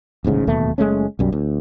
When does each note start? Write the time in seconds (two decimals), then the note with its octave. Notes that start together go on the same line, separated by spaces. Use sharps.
0.24 D#1 A1 G#2 C#3
0.47 D1 D#2 B2 A3
0.78 F#1 G#3 A3 C#4
1.19 B1 F#2 G3
1.32 D2